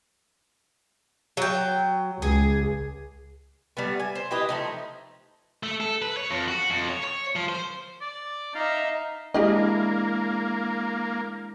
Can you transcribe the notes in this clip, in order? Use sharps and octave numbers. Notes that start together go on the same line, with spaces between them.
F#3 G5
C#2 G#4
G3 A3 B3
G#5
C5
E4 G4 B4 D#5
F3 A3 D#4
A3
A4
B4
C#5
F2
F#4
F2
C#5
C#5
F3
C5
D5
D#4 E5 F5
G#3 A#3 D4 E4 G4 G#4 D#5